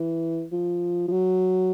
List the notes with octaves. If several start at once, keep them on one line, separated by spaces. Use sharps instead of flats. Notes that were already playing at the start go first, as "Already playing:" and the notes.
Already playing: E3
F3
F3
F#3